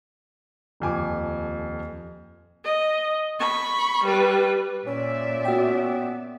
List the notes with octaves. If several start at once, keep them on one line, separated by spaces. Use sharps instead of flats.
D#1 F2 G#5 D6
D#5
B5 C#6
G3 B4
A#2 C#4 D5 E5
B3 F#4 G5